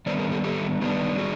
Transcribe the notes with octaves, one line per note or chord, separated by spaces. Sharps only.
D#3 G3 B3 D4 C5 D5
G#4 A#4
G4 A4
G4 A4
D#3 G3 B3 D4
F#4 G#4